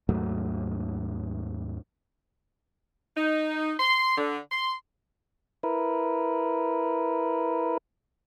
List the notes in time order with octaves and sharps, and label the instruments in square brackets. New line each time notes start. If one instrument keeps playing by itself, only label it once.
[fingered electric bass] D#2 G#2 F#3 A3
[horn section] D#4
C6
D3
C6
[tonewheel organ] E4 A#4 B4